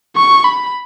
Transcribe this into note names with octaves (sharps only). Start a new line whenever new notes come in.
C#6
B5